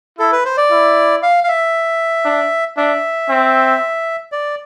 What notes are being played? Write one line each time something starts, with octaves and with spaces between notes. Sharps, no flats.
E4 A4
B4
C5
D5
E4
F5
F5
E5
D4
D4 E5
C4
D5